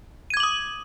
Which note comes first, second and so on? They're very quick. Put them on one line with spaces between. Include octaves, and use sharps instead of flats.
D#7 G#6 D6 F#7 D#6